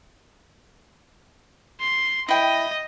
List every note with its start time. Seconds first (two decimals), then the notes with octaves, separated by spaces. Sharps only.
1.80 C6
2.28 E4 D#5 G5